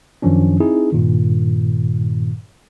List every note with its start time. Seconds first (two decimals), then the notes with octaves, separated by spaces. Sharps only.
0.22 F#2 D#3 F3 C#4 D4
0.60 C4 D#4 E4 G#4
0.92 G2 A#2 D#3